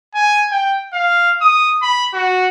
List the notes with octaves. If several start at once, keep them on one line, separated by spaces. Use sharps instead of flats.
G#5
G5
F5
D#6
B5
F#4